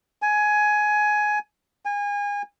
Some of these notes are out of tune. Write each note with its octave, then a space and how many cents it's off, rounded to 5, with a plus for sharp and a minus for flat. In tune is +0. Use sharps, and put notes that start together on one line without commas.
G#5 +15
G#5 -30